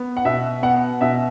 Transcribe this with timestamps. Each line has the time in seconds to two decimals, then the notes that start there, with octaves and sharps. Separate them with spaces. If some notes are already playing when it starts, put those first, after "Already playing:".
Already playing: B3
0.17 F#5
0.25 B2 E5
0.63 B3 F#5
1.01 B2 E5